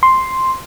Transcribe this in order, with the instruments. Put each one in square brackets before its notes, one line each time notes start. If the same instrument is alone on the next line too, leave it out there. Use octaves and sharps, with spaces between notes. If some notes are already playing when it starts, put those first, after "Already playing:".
[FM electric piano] C6